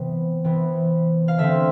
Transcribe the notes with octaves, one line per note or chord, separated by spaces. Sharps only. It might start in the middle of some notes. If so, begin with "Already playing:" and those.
Already playing: C3 E3 B3
C3 E3 B3
F5
D3 A3 C4 E5